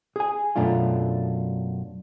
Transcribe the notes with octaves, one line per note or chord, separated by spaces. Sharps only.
G#4 G#5
F#2 B2 A3 D4 F4